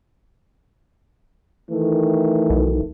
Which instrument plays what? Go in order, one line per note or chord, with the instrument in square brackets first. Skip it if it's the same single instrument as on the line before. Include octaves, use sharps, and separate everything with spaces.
[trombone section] D#3 E3 A3
[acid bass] B1